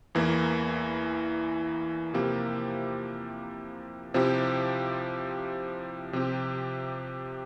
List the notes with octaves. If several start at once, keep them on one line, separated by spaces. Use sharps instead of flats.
E2 E3 A#3 E4
C3 F3 A#3 E4 G4
C3 F3 C4 E4 G4
C3 F3 C4 G4